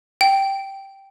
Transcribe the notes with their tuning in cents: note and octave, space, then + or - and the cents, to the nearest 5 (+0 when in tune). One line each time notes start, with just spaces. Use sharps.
G5 -5